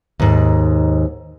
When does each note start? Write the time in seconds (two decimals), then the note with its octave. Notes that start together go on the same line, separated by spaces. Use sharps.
0.20 D#2 G#2